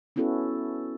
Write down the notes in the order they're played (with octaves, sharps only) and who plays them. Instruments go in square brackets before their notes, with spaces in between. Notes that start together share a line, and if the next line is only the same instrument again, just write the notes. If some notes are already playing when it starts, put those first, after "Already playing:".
[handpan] B3 C#4 E4 F#4 A4